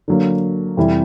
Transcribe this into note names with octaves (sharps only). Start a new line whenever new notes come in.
D3 F#3 A#3
F2 C3 E3 G3